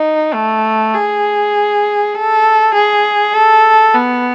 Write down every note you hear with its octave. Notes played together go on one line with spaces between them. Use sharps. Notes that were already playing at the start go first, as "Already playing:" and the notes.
Already playing: D#4
A3
G#4
A4
G#4
A4
B3